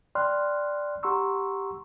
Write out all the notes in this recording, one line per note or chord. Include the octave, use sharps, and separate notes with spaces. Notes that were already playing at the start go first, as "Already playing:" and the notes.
D5 G5 B5 C6 F6 F#6
G4 F#5 A#5 C6 C#6 E6